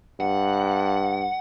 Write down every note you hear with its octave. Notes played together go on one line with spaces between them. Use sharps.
G2 F#5